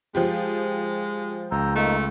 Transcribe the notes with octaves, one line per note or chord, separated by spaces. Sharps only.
F3 G#3 F4 G4
C#2 A#5 E6 G6
A3 A#3 D#4